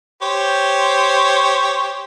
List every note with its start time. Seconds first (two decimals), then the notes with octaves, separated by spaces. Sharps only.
0.22 G4 C5 C#5